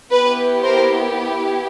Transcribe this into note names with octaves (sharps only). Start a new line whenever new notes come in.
B3 E4 G4 B4
A#4 C5